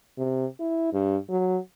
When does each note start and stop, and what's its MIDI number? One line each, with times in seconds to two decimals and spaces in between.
0.18 0.46 48
0.60 0.93 64
0.93 1.17 43
1.29 1.57 54